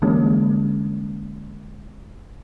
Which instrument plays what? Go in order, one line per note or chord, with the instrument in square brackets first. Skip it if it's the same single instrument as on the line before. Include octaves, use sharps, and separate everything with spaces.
[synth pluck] D3 E3 G3 G#3 A#3 C#4